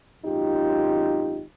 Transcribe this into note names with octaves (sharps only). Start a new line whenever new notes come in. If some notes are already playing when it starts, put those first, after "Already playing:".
G#1 F#2 D#4 F4 G4